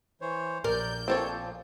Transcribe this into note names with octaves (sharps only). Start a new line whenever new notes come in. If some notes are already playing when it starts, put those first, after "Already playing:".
E3 C5 C#5
A#1 A#4 D5 G6
A#2 F3 A#3 C4 A4 C#5